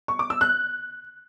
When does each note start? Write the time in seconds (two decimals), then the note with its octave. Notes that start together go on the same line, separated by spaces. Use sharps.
0.08 C#6
0.19 D6
0.30 E6
0.41 F#6